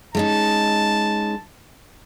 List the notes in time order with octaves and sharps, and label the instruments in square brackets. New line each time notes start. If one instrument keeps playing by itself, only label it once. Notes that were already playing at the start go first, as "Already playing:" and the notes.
[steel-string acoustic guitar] G#3 C#4 D#4 [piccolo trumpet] A5